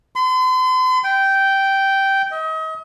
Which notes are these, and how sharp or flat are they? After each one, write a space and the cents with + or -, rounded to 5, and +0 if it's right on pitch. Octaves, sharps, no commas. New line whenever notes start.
C6 -40
G5 -10
D#5 +35